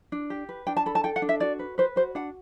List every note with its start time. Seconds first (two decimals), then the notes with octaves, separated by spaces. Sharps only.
0.12 D4
0.30 G4
0.49 B4
0.67 D4 G5
0.77 A5
0.86 A4 B5
0.95 A5
1.04 A4 G5
1.16 F#5
1.22 D4
1.29 E5
1.40 F#4 D5
1.59 B4
1.78 B4 C5
1.96 F#4 C5
2.15 D4 F#5